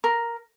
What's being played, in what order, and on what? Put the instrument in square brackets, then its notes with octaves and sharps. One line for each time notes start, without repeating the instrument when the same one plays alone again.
[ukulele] A#4